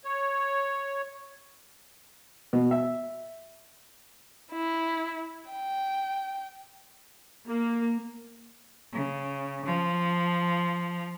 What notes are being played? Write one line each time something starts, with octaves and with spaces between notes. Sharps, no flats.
C#5
B2
E5
E4
G5
A#3
C#3
F3